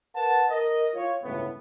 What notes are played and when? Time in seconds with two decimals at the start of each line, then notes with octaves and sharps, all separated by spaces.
0.15 A#4 B4 F#5 A5
0.49 A#4 D#5
0.95 F4 C#5
1.23 G1 C#2 A2 B3